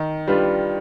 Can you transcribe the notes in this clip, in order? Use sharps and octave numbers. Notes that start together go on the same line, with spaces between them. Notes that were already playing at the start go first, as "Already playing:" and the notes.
Already playing: D#3
G3 D4 F4 B4